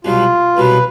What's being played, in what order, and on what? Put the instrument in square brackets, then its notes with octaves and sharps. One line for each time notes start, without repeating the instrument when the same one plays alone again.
[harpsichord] C2 B2 F#3 [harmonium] F4
[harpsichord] C2 B2 F#3 [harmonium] B4